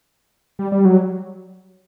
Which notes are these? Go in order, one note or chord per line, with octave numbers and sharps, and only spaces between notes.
G3
G3
F#3